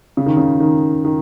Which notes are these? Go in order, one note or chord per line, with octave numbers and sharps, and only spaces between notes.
C#3
D#3
C#3
D#3
D#3